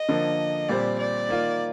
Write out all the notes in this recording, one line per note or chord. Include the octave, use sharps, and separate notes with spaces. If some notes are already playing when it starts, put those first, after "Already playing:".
Already playing: D#5
D3 F3 A#3
A#2 G3 C4 G4 C5 D5
D5
D#3 A#3 F4